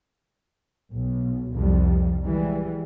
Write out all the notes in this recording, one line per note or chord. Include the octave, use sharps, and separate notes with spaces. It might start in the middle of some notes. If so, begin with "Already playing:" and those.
B1
C2 F2 C3 F3 G3
E3 G3 G#3